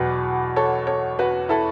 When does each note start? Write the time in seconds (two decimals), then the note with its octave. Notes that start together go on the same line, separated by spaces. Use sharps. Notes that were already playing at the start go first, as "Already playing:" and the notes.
Already playing: E2 B2 F#3 B4
0.56 A4 C#5
0.87 A4 C#5
1.19 F#4 B4
1.49 E4 A4